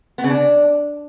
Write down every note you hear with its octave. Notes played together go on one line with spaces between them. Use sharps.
B3
C#3
D4